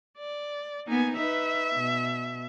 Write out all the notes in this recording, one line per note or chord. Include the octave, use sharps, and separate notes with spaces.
D5
A#3 B3 D#4 G#5
D#4 B4 E5
B2